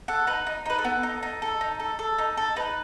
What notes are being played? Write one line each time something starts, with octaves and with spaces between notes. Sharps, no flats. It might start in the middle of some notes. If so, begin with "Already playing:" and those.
A4 F#5
D#4 B4
D#4
D#4 B4
A4
B3
D#4
D#4
A4
D#4
A4
A4
D#4
A4
D#4 B4